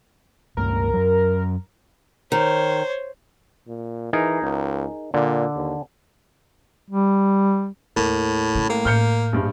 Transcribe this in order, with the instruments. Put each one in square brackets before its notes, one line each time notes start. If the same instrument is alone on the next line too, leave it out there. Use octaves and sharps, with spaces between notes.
[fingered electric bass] C#2 G2 A3 [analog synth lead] A#4
[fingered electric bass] F#2 F#3
[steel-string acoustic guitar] D#3 [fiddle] C5 C#5
[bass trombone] A#2
[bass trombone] E3 [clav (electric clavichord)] D#4 G#4 A#4
[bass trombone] C#2
[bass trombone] A#2 [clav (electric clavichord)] D3
[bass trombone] D#2
[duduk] G3
[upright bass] D#2 [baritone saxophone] A2 [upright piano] A#3
[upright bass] C#3 G3
[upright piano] A2 [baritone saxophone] A#3
[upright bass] A2 [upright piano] F6 G6 C#7
[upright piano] A#1 G2